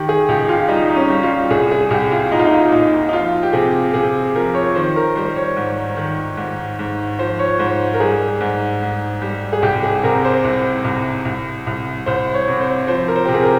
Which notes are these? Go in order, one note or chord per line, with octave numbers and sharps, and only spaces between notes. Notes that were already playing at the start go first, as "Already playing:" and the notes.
Already playing: D#3 G4
G#4
C#2 G4
F4
G3 D#4
D#4
C#4
G3
F4
C2 G#4
G#4
C2 G4
F4
A#2 D#4
F4
D#4
A#2 D#4
D#4
F3 F4
G4
C3 G#4
C3 G#4
F3 A#4
C#5
D#3 C5
A#4
G3 C5
C#5
G#2
D#3
G#2
G#2
F3 C5
C#5
G#2 C5
A#4
G3 G#4
G#2
G#2
G3
G#4
C2 G4
G#4
C3 A#4
C5
C2
C2
C2
C2
C2 C5
C#5
C3
C5
F3 C5
A#4
C5
C3 G4
G#4
A#4